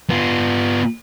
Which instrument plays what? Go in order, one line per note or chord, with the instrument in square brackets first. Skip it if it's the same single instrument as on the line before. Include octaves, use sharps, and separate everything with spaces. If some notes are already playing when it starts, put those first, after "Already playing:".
[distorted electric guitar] B3 F4